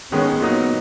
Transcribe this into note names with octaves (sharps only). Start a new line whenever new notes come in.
D#3 G#3 B3 C#4
A#2 F#3 A#3 B3 D#4 F#4